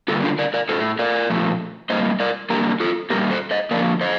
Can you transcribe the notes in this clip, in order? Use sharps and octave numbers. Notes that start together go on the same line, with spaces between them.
D3 G3 A#3 F4 A4
D4 F4
A#4 D5
A#4 D5
A2 A3 A4 C5
A#4 D5
A#2 F3 A3
A2 G3 A#3 C5 D#5
A#4 D5
D3 G3 A#3 G4 A#4
F4 A4
A#2 G3 A#3 G4 A#4
A4 C5
C5 D#5
D3 F3 A#3 A#4 D5
C5 D#5